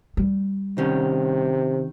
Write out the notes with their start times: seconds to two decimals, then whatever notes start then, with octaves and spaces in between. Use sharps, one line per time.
0.17 G3
0.78 C3 D#3 C#4